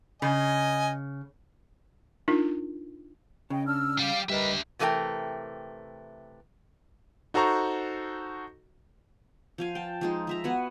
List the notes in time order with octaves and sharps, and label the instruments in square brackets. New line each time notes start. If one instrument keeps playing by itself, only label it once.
[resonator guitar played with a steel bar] C#3 [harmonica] D#5 G#5
[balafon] D4 D#4 F4 A#4
[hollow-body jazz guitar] C#3 [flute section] D#5 G5
[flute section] D4 E6 F6
[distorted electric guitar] G3 G4 [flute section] F5
[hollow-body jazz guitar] G3 [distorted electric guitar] D4 E5 [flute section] A#4 B4 D#5
[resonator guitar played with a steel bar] C3 E3 A3 F4 A#4 G5
[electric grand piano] D#4 F#4 A4 C5 A#5 C#6
[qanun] F3 F5 G#5
G5 A5
F3 G#3 D#4
F3 E5 A#5
B3 F#4 F#5 G#5